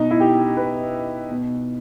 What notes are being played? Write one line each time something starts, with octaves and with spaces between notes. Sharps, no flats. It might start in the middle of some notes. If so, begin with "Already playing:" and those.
Already playing: B2 D#4
E4
G4
B2 B4
B2